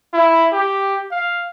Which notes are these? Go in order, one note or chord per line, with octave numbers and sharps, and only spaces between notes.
E4
G4
F5